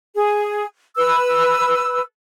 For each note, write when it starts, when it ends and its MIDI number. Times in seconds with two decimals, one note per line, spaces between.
0.15 0.64 68
0.96 2.00 71
0.96 2.00 88